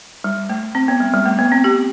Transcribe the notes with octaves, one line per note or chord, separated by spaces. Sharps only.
G3
A3
C4
B3
G3
G3
A3
B3
C4
G4